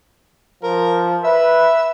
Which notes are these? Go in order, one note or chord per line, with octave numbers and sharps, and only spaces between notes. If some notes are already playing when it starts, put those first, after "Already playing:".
F3 A#4
B4 E5